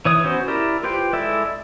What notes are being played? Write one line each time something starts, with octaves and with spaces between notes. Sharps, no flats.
E3 C#5 D#6
B3 C#4 F#4 C5
E4 G4 A#4 D5
F4 G4 B4 C5 G5
G#3 E4 A4 D5 E5